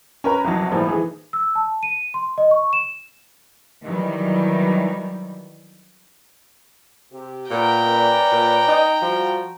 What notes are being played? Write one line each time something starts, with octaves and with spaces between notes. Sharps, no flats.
C#4 A#4 B4
C2 F2 F#3
A2 E3 F3 G3 A#3 B3
D#3 E3 G#4
E6
A5
D#7
C6
D#5
C#6
E7
D#3 E3 F#3 G3
C3 G4
A#2 B3 A#4 G5 A#5
C#4 B4 D5
A#2
D#4
F3 G3 F#4